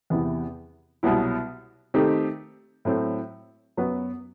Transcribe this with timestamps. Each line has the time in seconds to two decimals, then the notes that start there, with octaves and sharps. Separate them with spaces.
0.10 E2 C3 E3 B3
1.03 C2 B2 F#3 B3 E4
1.94 D#3 A3 C4 D#4 G4
2.85 A2 F#3 A3 C4
3.77 F#2 F#3 B3 F#4 B4